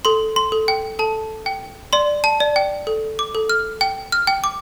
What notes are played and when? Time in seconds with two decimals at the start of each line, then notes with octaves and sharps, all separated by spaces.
0.05 A4 C6
0.36 C6
0.52 A4
0.68 G5
0.99 A4 A5
1.46 G5
1.93 D5 C6
2.24 A5
2.40 D5
2.56 G5
2.87 A4
3.19 D6
3.35 A4
3.49 F6
3.81 G5
4.12 F6
4.27 G5
4.44 D6